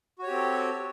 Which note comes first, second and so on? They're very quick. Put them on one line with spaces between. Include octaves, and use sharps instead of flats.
F#4 C#5 G4 C4 A4